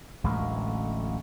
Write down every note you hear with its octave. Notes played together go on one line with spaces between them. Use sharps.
D1 A1 D2 G#3